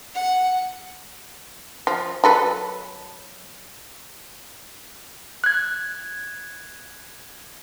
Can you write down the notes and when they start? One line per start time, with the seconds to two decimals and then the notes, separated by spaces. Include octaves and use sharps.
0.14 F#5
1.87 F3
2.24 F#3 A4 B4
5.44 F#6 G#6